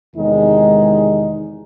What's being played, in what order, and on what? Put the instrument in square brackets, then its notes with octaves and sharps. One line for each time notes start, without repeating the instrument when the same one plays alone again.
[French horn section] E2 C3 D#3 G#3 D#4